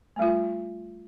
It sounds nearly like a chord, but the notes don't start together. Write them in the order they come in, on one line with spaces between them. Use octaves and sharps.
A3 G3 F4